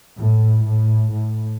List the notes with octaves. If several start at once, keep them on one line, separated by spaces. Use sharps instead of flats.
A2
A2
A2